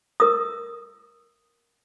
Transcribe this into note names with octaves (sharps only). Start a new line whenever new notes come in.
A#4 D#6